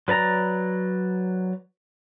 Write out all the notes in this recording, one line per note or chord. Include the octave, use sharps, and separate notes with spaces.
F#3 B4 D5 A#5